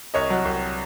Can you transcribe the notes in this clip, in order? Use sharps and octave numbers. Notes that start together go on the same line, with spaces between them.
C2 C#5 D#5
F#3
C2